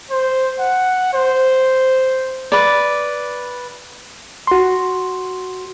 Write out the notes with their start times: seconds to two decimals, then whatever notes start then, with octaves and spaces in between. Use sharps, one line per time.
0.11 C5
0.60 F#5
1.14 C5
2.52 B4 D5
4.47 F#4 C6